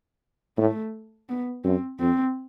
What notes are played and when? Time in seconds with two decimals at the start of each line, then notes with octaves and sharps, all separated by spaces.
0.58 A2 A3
1.29 B3
1.64 F#2 C4
2.00 F2 C4